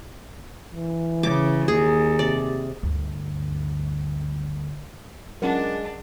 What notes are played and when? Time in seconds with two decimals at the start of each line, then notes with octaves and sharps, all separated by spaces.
0.73 E3
1.23 C#3 D6
1.68 D#2 G#4
2.19 C3 D5
2.83 D2 G2
5.42 F#3 G#3 C#4 D4 F4 A#4 F#5